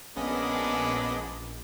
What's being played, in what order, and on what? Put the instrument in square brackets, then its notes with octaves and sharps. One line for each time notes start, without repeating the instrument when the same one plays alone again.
[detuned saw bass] A#1 [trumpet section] G#3 A#3 D4 [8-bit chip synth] B3 D#5 B5 [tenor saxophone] C#4